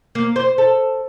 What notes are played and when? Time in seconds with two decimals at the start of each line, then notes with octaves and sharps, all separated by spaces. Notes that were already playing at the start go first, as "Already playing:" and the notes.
0.15 A#3
0.36 C5
0.58 A4